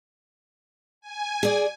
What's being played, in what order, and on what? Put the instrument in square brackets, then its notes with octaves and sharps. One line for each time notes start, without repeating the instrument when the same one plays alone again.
[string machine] G#5
[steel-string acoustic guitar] G#4 D5